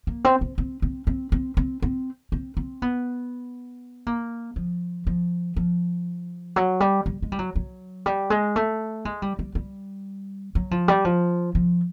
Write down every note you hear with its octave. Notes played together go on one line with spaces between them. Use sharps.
A#3
C4
C4
C4
C4
C4
C4
C4
C4
C4
C4
B3
A#3
F3
F3
F3
F#3
G3
G3
G#3
G3
F#3
F#3
G3
G#3
A3
G#3
G3
G3
G3
F#3
F3
G3
F3
F3